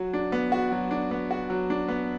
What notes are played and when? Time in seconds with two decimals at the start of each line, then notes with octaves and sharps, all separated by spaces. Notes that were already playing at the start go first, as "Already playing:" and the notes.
Already playing: F#3 F#4
0.13 D4
0.32 B3
0.52 F#4
0.72 F#3
0.91 D4
1.11 B3
1.31 F#4
1.50 F#3
1.70 D4
1.88 B3